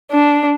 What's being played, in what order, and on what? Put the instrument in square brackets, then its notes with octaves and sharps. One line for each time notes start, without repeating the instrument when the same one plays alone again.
[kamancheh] D4